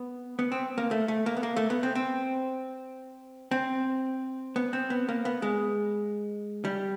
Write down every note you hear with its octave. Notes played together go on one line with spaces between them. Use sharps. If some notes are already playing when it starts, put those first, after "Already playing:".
Already playing: B3
B3
C4
A#3
A3
A3
A#3
B3
A#3
A3
B3
C4
C4
C4
B3
C4
B3
A#3
B3
G#3
G3